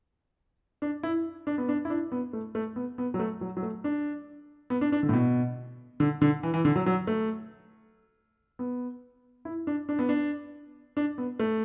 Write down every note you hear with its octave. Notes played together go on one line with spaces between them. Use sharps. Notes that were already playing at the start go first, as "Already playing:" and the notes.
D4
E4
D4
B3
D4
E4
D4
B3
A3
A3
B3
B3
F#3
A3
F#3
F#3
A3
D4
B3
D4
D4
D3
A2
B2
D3
D3
E3
E3
D3
F#3
F#3
A3
B3
E4
D4
D4
B3
D4
D4
B3
A3